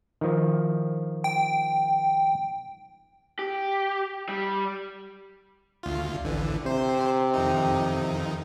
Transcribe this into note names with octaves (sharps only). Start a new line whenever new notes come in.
D#3 F3
G5
G4
G3
D2 F4
A1 D3 E3
C3 C5
F2 D#3 D#4